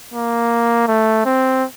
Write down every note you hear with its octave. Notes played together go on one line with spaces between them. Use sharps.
A#3
A3
C4